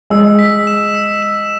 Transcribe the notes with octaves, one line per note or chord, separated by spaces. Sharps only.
G#3 E6
B6
E7
E6
E7